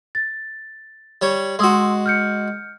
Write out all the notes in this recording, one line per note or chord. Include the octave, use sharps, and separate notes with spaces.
A6
G3 C#5
G#3 F#4 C6 D#6 E6
F6 G6 C#7